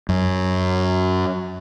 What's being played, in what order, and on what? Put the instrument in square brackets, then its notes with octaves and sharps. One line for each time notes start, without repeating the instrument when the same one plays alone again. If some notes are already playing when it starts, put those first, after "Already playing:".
[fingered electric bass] F#2